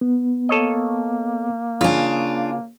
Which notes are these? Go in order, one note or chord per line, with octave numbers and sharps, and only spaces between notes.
B3
A#3 A4 C#5 D#5
C#3 D4 F4 F5 G#5